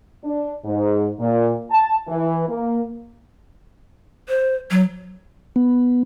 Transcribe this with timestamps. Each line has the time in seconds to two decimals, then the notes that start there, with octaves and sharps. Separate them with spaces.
0.24 D4
0.65 G#2
1.20 A#2
1.71 A5
2.08 E3
2.49 A#3
4.29 C5
4.71 F#3
5.56 B3